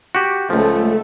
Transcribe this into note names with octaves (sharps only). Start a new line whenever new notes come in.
F#4 G4
C#2 F3 A3